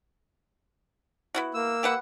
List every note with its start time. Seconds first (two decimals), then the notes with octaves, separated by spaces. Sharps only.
1.34 B3 E4 F#4
1.54 A#3 E6
1.83 G4 B4 F#5